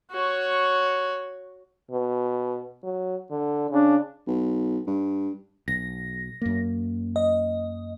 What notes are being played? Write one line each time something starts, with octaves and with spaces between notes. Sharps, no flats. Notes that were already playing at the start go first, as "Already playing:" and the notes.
F#4 C#5
B2
F#3
D3
C#3 D4
B1
G2
B1 A#6
F#2 A#3
D#5